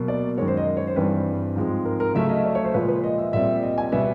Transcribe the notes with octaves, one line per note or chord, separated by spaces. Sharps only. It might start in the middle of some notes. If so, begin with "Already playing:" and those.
Already playing: B2 F#3 A#3
D5
F#2 D#3 G#3 C#5
C5
D#5
C#5
C5
G2 E3 G3 C4 B4
G#2 F3 G#3 C4
A#4
A#4
C#3 F#3 A3 C#4 E5
D#5
D5
C#5
C5
A#2 F3 G#3 B4
B4
D#5
E5
A#2 G3 C4 E5
D#5
G#5
B2 G3 B3 E5